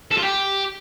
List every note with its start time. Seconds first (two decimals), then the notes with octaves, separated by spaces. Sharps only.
0.11 A4
0.17 F4
0.23 G4